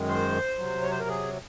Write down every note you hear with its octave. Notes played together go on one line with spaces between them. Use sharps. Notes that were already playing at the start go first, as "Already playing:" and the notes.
Already playing: F#2 D#3 G#3
C5
C3 F#3
C#5
C5
A#4
G#4